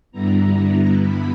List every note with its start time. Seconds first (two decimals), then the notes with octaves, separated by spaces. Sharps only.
0.12 G2 D3 G3 B3 E4 A#5
1.02 B5